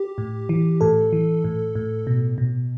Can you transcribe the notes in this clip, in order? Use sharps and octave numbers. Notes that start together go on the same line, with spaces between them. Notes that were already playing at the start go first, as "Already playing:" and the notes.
Already playing: G4
A2
E3
A2 A4
E3
A2
A2
B2
B2